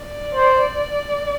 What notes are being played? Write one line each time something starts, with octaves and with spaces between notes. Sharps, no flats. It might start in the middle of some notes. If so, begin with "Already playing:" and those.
Already playing: D5
C5